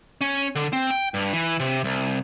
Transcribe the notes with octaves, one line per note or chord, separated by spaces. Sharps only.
C#4
D3
C4
G5
G2
E3
C3
C2